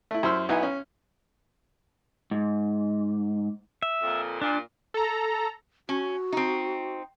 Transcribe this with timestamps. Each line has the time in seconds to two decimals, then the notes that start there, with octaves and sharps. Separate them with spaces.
0.11 A3 E4
0.23 F#2 E4 C5 C6 E6 F6
0.49 B1 B3 D#4 E4 G#5
0.63 C#4
2.31 G#2
3.82 E5
4.03 F2 A#2
4.42 A#2 D4
4.94 A4 A#5
5.89 C#4 F#4
6.33 C4 D#4